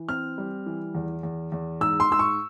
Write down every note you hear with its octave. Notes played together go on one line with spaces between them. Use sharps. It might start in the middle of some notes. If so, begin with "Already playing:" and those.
Already playing: E3
C4 F6
G3
E3
E2
E2
E2
G#2 E6
C6
G#2 E6
C#6